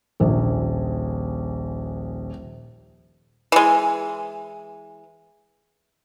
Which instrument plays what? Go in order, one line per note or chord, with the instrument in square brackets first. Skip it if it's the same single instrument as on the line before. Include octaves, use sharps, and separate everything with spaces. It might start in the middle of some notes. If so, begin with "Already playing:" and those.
[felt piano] D#1 A#1
[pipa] E3 G#3